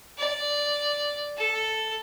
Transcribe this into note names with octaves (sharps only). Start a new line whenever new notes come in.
D5
A4